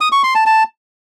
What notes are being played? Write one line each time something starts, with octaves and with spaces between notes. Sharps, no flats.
D#6
C#6
C6
A5
A5